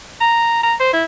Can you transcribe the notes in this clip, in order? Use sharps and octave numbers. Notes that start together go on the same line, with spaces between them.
A#5
A#5
C5
E4